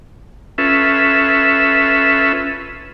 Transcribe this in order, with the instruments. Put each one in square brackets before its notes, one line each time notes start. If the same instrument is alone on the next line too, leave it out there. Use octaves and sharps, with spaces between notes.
[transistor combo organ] C#4 F4 A4 B4 E5